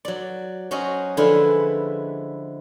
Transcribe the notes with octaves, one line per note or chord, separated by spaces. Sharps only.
F#3 D5
F#3 C#4 F#4 C5 D#5
D3 F3 G#3 E4 F4 B4